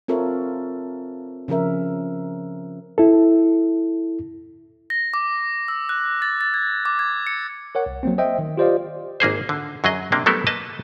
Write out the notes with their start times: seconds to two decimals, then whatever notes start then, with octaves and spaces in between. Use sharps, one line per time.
0.08 C4 F4 A4 A#4 C#5 E5
1.48 C#3 F3 C#4 A#4 E5
2.98 E4 A4
4.90 A#6
5.14 D6
5.68 E6
5.89 F#6
6.22 A6
6.41 A6
6.54 G#6
6.85 D6
6.99 G#6
7.27 C#7
7.75 A#4 C#5 F#5
7.86 C2
8.03 F#3 A#3 C4
8.18 C5 D#5 E5 G5
8.39 D#3
8.57 F4 G4 C5 D5 D#5 F5
9.20 G#1 A#3 G#4 C5
9.49 D3
9.84 F#2 F#3 G#4 D#5
10.12 C3 A#3 D4
10.26 F#3 G3 A3 B3 A4 A#4
10.47 A#3 B4 D#5 A5